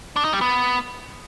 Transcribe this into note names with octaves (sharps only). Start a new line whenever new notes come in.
D4
D#4
G3
B3